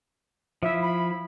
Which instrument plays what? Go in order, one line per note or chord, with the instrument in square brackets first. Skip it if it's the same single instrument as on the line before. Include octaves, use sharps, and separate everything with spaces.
[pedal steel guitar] F3 E4 [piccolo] E5
[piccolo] B5